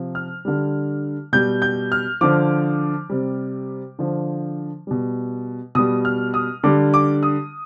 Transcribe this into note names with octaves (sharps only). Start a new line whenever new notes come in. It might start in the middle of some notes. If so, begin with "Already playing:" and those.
Already playing: C3 F3
F6
D3 G3
B2 G3 G6
G6
F6
D3 F3 D6
C3 G3
D3 F3
B2 G3
B2 G3 D#6
F6
D#6
D3 G3 D6
D6
D#6